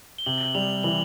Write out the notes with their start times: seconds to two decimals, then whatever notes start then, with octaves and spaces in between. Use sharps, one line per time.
0.18 G7
0.26 C3 F#7
0.55 G3 F7
0.83 E3 F#7